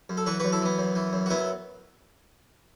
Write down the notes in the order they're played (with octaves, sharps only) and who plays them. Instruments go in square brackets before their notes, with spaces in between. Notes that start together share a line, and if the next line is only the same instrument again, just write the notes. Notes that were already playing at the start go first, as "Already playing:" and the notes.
[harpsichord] F#2
A4
E3 F#4 B4
F#4 B4
F#2
E4 A4
E3 B3
F#2
E3
F#2
F#4
F#3 B3 E4